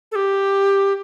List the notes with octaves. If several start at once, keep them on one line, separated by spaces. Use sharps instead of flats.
A4
G4